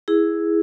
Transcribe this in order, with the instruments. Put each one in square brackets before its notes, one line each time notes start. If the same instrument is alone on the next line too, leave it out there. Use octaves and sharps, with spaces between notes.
[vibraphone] E4 G#4